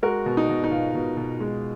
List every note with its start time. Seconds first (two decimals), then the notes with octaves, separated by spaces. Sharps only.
0.02 G#3 F#4 A#4
0.26 B2
0.37 D#4
0.49 B2
0.64 D#4
0.71 B2 F4
0.95 B2
1.17 B2
1.40 G#3